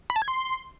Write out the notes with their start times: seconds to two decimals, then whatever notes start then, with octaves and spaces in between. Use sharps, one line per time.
0.10 B5
0.16 A5
0.22 G#6
0.28 C6